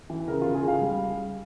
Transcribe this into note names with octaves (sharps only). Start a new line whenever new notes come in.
E3
C#3 A#4
C#3 F4
G#4
C#3 F5
G3